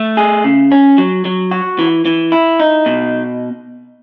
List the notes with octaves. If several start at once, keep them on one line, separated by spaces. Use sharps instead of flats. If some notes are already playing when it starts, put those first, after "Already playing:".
Already playing: A3
G#4
C#3
C#4
F#3
F#3
F#4
E3
E3
E4
D#4
B2